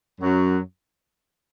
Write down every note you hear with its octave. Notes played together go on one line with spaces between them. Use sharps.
F#2 F#3